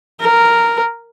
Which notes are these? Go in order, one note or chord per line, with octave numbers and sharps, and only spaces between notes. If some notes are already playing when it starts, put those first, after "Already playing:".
A#4